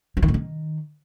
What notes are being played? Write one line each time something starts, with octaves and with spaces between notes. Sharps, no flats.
F3
D#3
A2
D#3